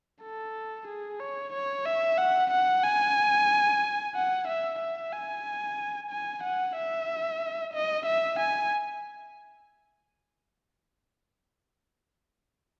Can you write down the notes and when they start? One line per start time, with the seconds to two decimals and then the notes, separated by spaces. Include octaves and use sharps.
0.23 A4
0.88 G#4
1.20 C#5
1.54 C#5
1.86 E5
2.18 F#5
2.51 F#5
2.83 G#5
4.15 F#5
4.48 E5
4.79 E5
5.12 G#5
6.11 G#5
6.43 F#5
6.77 E5
7.74 D#5
8.06 E5
8.39 G#5